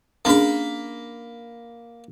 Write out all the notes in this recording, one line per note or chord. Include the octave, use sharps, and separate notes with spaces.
A#3 C#4 D4 G#4 B5